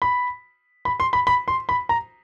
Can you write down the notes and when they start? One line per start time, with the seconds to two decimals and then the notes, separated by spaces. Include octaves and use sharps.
0.02 B5
0.85 B5
1.00 C6
1.13 B5
1.27 B5
1.48 C6
1.69 B5
1.89 A#5